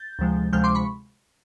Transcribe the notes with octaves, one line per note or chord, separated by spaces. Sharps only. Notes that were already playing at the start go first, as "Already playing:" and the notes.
Already playing: G6 A6
D2 C3 F3 G#3
D2 C3 F3 G#3 F6 G6
C6 D6
B5 C#6